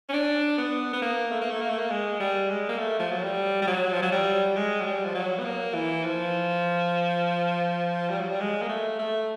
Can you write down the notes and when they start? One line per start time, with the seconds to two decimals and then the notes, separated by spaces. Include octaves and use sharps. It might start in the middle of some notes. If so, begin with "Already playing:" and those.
0.09 C#4
0.13 D4
0.58 B3
0.93 B3
1.02 A#3
1.32 A3
1.41 A#3
1.50 A3
1.61 A#3
1.70 A3
1.78 A#3
1.90 G#3
2.20 G3
2.50 G#3
2.69 A#3
2.79 A3
2.99 F3
3.11 F#3
3.23 G3
3.62 G3
3.67 F#3
3.93 F3
4.02 F#3
4.12 G3
4.56 G#3
4.81 F#3
4.86 G3
5.05 F3
5.15 F#3
5.39 B3
5.45 A#3
5.74 E3
6.04 F3
8.10 G3
8.20 F#3
8.29 G3
8.40 G#3
8.62 A#3
8.69 A3
8.99 A3